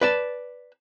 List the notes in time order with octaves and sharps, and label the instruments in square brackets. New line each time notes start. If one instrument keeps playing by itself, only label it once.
[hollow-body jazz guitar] B4 D5 A5